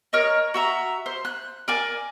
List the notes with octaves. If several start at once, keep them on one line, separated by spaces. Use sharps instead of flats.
A#4 C#5 D#5
F#4 E5 A#5
C5
F#6
A#4 D5 G#5